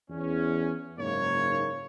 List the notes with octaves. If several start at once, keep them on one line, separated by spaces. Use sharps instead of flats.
E2 C#4
F#1 G#2 A#3 C#5